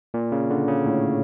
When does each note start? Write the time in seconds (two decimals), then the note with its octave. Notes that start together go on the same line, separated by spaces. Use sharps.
0.14 A#2
0.32 C#3
0.50 D3
0.68 C#3
0.86 A2